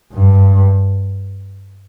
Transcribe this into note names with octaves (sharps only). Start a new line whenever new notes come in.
G2